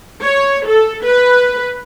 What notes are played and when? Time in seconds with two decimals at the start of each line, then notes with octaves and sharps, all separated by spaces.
0.23 C#5
0.66 A4
1.04 B4